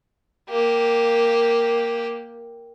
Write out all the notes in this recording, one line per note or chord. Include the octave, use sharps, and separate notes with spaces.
A#3 G4